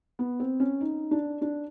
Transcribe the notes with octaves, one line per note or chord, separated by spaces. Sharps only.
B3
C4
C#4
D#4
D4
D4